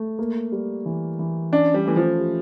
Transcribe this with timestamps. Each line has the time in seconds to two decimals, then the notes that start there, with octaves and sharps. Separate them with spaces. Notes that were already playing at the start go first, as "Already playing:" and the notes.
Already playing: A3
0.19 A#3
0.52 G3
0.86 E3
1.19 E3
1.52 C#4 D4
1.74 G3
1.86 E3 A3
1.96 F3
2.19 G4